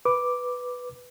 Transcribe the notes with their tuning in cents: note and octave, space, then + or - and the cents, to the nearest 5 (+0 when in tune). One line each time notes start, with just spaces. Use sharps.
B4 +0 D6 +0